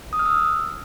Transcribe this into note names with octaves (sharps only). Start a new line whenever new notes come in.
D#6
F6
E6